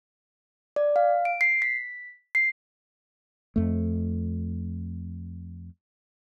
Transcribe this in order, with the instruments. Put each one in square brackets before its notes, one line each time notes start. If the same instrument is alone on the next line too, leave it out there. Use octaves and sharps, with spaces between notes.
[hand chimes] D5
F5
D7
C7
B6
C7
[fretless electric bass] F2 A3